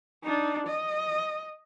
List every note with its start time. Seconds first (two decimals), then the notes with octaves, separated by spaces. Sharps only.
0.23 D4 D#4
0.67 D#5